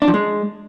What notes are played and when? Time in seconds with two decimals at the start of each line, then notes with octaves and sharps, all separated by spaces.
0.02 D4
0.08 F3
0.14 G#3